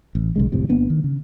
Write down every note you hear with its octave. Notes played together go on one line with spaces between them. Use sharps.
A1
B1 C#3 G#3
G#1 F2 A2 C3
G1 A#3 B3 D4
D#3
C#3